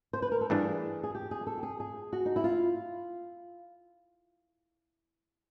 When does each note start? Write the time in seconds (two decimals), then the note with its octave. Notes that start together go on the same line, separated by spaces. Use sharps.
0.13 C5
0.22 B4
0.32 A#4
0.41 A4
0.50 G2 E3 A3 D4 G#4
1.03 G#4
1.15 G4
1.31 G#4
1.47 A4
1.58 G4
1.63 G#4
1.80 G#4
2.13 F#4
2.26 D#4
2.36 E4
2.44 F4